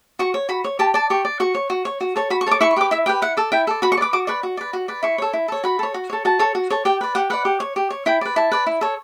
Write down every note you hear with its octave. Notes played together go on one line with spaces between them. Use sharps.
F#4 C#6
C#5
F#4 B5
C#5
G4 A5
D5 A5
G4 C#6
D5
F#4 C#6
C#5
F#4
C#5
F#4
A4 C#5
F#4 B5
C#6
A4 C#5 D6
E4 C#6
C#6
G4 B4 D6
E4 E5
G4 B4 G5
E4 F#5
A4 D5
E4 G5
A4 D5
F#4 B5
C#6
D5
B4 D6
F#4 D6
B4 D5 C#6
F#4
B4 D5
F#4
B4 D5
E4 C#6
A4 C#5
E4
A4 C#5
F#4 B5
A4 C#5
F#4
A4 C#5
F#4 A5
A4 C#5
F#4
A4 C#5
G4 G5
B4 D5
G4 F#5
B4 D5 F#5
G4
C#5
G4
C#5
E4 G5
B4 D5
E4 A5
B4 D5
E4
A4 C#5